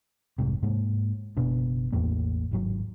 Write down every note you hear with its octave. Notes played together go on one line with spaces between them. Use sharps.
F1 C2 G#2 C3
G#2 G#3 A#3
F#1 B2 B3 D4
A1 E2 A2 A#3
G#1 G#2 F#3